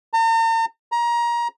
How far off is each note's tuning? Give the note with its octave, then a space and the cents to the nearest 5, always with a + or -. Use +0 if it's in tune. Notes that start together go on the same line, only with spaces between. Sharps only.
A#5 -45
A#5 +25